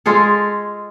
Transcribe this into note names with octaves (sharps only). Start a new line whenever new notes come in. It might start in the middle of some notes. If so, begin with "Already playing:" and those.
G#3 F4 G#4 A4